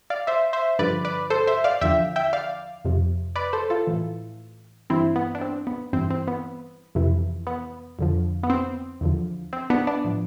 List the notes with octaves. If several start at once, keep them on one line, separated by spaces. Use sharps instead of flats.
D5 F5
C5 E5
C5 E5
G2 D3 F3 B4 D5
B4 D5
A4 C5
C5 E5
D5 F5
E2 D3 F3 E5 G5
E5 G5
D5 F5
F2 C3 F3
B4 D5
A4 C5
F4 A4
A2 E3
G2 E3 C4 E4
B3
D4
C4
B3
G2 E3 C4
C4
B3
F2 C3 E3
B3
F2 D3 F3
B3
C4
E2 D3 F3
C4
B3 D4
B3 D4
A2 F3